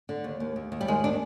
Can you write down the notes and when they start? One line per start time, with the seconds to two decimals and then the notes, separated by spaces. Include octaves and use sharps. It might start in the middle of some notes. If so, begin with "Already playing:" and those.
0.09 D3
0.24 D#2
0.40 D#2
0.56 D#2
0.72 D#2
0.81 G3
0.88 D#3 G#3
1.04 D#3 D4